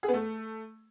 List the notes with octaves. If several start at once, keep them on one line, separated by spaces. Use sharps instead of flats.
G#4
B3
A3